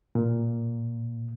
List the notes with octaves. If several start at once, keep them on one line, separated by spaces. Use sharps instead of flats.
A#2